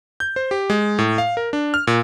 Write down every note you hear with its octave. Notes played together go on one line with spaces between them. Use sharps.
G6
C5
G4
G#3
A2
F5
A#4
D4
F6
A#2